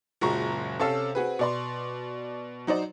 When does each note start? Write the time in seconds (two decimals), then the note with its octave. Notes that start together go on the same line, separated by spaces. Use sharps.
0.21 F#1 A#2 F#3 G#3 A#5 C#6
0.80 C3 C#4 A4 F5 E6
1.15 C4 F#4 G#4 B4
1.39 B2 D5 C6
2.67 F#3 D#4 C5 D5